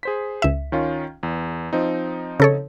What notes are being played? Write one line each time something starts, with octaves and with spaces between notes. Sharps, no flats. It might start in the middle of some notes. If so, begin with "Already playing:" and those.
G#4 C5 B6
C#2 E5
D#3 C#4 F4
E2
F3 C4 D#4
C#3 A4 C#5